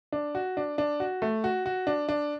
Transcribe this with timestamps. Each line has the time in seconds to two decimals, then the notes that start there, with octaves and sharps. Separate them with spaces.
0.12 D4
0.35 F#4
0.57 D4
0.78 D4
1.00 F#4
1.22 A3
1.44 F#4
1.66 F#4
1.87 D4
2.09 D4